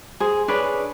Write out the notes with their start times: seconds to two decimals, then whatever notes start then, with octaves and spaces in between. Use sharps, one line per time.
0.20 G#4 C5
0.48 D4 G#4 B4 C#5